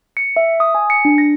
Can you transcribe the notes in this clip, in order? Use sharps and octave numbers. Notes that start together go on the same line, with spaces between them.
C#7
E5
D#6
G#5
C#7
D4
A#6